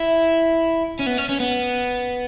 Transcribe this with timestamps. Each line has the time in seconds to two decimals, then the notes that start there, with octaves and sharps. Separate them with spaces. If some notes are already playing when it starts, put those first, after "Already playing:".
Already playing: E4
0.99 C#4
1.06 B3
1.17 C#4
1.29 C#4
1.40 B3